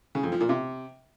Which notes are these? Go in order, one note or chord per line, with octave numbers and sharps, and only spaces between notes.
C#3
F2
F3
A#2
C3